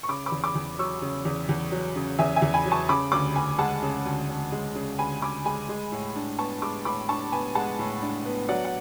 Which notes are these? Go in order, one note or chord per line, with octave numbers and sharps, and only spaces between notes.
C#6
C#3 B5 D6
B5 D6
E2
B5 D6
E2
F#3 C#6 E6
C#3
E2
E2
F#3
C#3
E2 E5 G#5
E5 G#5
E2
G#5 B5
F#3
A5 C#6
C#3 B5 D6
D2 B5 D6
D2 G#5 B5
G#3 F#5 A5
C#3
D2
D2
G#3
C#3
D2 G#5 B5
D2 B5 D6
G#3 G#5 B5
G#3
A2
D4
B3 A5 C#6
G#3 B5 D6
A2 B5 D6
D4 A5 C#6
B3 G#5 B5
G#3 F#5 A5
A2
D4
B3
F#3 D5 F#5
F#5